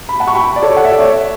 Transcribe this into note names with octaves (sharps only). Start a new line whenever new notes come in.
B5
F#5 A5
C#6
G5 B5
D5
A4 C#5
F#5
E5
D5
C#5 E5